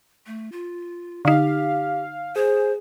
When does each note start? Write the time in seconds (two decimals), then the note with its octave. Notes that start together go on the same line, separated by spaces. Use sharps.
0.27 A3
0.52 F4
1.25 D3 D#4 G4 F5
2.36 G#4 C5